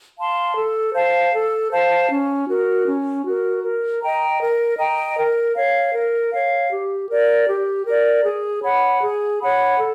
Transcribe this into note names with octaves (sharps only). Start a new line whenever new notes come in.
F5 A5 C6
A4
C5 F5 A5
A4
C5 F5 A5
C#4
F#4 A#4
C#4
F#4 A#4
A#4
D#5 G5 A#5
A#4
D#5 G5 A#5
A#4
C#5 F5
A#4
C#5 F5
G4
A#4 D5
G4
A#4 D5
G#4
C#5 F#5 B5
G#4
C#5 F#5 B5
A4